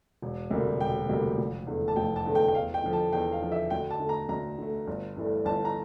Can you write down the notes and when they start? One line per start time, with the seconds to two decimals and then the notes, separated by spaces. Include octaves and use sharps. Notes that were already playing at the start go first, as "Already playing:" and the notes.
0.22 E1
0.51 D2 C3 G3 A#3
0.81 E1 G5
1.09 D2 C3 G3 A#3
1.38 F1
1.67 E2 D3 A3
1.88 A5
1.96 F1 G5
2.16 A5
2.26 E2 D3 A3
2.35 G5
2.48 G5
2.54 E2 F5
2.74 G5
2.84 D3 F3
2.93 A5
3.12 E2 G5
3.32 F5
3.42 D3 F3
3.52 E5
3.70 D2 G5
3.91 A5
4.00 D3 A3
4.09 A#5
4.29 D2 A#5
4.58 D3 A3
4.87 G1
5.17 G2 E3 A3
5.45 G1 A5
5.65 A#5